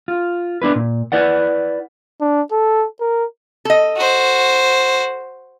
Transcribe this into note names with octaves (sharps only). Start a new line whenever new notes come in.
F4
B3 D4 E4 B4
A#2
E4 B4 D5 F#5
D4
A4
A#4
A4 D#5
F#4 C5